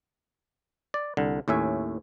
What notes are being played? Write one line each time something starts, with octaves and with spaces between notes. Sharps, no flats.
D5
C2 D3
D#2 A2 C#4 E5 G#5